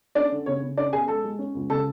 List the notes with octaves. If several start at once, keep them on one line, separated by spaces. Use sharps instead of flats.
C#4 D4 D5
D3
C#3 C#5
C#3
C#4 D4 D5
B2 G#4 G#5
G#3 A4 A5
G#3
C#4
C#2
C#3 A4 A5